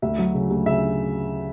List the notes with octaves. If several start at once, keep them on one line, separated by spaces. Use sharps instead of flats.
D2 E5
F#3
C#3
D2
C#3 E5